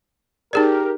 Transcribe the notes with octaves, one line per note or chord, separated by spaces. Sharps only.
D#4 G4 G#4 A#4 D5